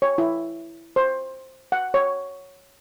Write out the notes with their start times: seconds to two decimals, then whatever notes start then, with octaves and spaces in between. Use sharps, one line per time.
0.02 C#5
0.18 E4
0.96 C5
1.72 F#5
1.94 C#5